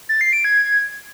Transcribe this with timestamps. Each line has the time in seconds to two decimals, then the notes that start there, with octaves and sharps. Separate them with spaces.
0.09 A6
0.21 C7
0.33 D7
0.45 G#6